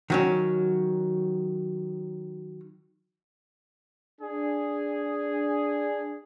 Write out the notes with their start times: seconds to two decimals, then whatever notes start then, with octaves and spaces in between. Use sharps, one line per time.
0.10 D#3 F#3 C#4
4.20 D4 G#4